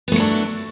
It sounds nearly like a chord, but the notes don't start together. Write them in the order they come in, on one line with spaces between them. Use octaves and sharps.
B3 A3 F#3 D4